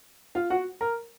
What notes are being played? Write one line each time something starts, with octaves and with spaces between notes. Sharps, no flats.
F4 F5
F#4 F#5
A#4 A#5